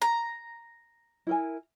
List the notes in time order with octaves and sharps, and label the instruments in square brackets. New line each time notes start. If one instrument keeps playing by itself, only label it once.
[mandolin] A#5
[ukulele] E4 A#4 G#5